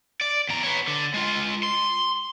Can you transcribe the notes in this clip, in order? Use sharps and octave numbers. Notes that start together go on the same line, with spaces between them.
D5
E2 A#5
B4 C#5
D3
G#3 F4
C6